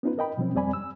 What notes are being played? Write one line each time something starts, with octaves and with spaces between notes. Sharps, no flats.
B3 C#4 D#4 F4 B4
A#4 D#5 G5 B5
B2 F3 F#3 C4 C#4
F2 G3 C4 D5 G#5 B5
E6